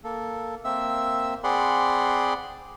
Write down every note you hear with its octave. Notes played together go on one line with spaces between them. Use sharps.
A#3 A4
A#3 C4 E5 E6
C4 G#4 D5 F#5 B5 C6